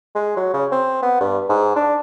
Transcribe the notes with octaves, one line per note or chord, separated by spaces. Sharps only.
G#3
F#3
C#3
C4
B3
G2
G#2
D4